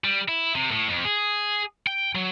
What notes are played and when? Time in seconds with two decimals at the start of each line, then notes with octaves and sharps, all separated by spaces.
0.04 G3
0.28 E4
0.55 C3
0.71 A2
0.88 F2
1.05 G#4
1.87 G5
2.15 F#3